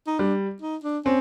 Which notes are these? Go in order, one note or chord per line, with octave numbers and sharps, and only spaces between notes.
D#4
G3 D4
D#4
D4
C4 C#4